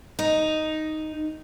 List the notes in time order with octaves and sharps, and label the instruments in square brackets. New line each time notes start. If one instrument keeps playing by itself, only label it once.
[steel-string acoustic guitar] D#4